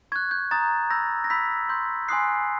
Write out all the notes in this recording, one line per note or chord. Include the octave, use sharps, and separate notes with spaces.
C#6 F#6 G#6
G6
A#5 D#6 G6 A6
B5 E6 G6 A#6
A#6
B5 E6 G6 B6
C6 E6 G6
G#5 C6 D#6 F#6 C7